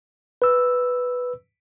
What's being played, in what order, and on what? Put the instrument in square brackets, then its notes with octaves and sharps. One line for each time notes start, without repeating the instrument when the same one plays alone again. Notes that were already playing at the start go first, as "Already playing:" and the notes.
[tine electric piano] B4 E6